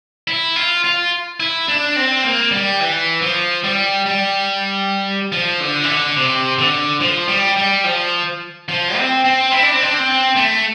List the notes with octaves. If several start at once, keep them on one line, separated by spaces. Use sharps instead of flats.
E4
F4
F4
E4
D4
C4
A#3
G3
E3
F3
G3
G3
F3
D3
E3
D3
C3
D3
F3
G3
G3
F3
F3
C4
C4
E4
D4
C4
D4
C4
A3